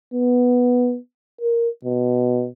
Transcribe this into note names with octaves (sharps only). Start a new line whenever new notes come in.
B3
A#4
B2